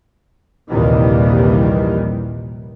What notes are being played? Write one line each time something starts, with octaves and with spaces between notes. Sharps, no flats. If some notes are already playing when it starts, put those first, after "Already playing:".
A#1 D#2 C3 D#3 E3 G3